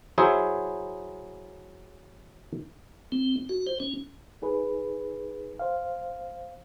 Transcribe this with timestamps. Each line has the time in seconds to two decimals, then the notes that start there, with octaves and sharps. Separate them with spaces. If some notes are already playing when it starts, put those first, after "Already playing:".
0.18 F#3 E4 G#4 C5 E5
3.12 C4
3.49 F#4
3.67 C5
3.80 C#4
4.42 D#4 G#4 B4
5.59 C5 F5